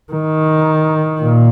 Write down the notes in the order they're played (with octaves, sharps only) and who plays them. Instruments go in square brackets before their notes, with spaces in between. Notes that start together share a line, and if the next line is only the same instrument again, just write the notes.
[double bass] D#3
A#2